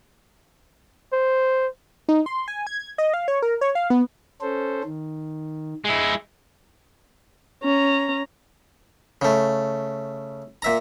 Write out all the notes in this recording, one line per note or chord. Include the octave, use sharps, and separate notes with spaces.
C5
D#4
C6
G#5
G#6
D#5
F5
C#5
A#4
C#5
F5
B3
C#4 A4 C5
D#3
G#3 E4
C#4 A#5
C#3 A3
A#2 E5 A#5